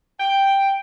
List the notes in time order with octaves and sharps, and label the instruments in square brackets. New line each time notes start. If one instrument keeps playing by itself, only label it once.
[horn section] G5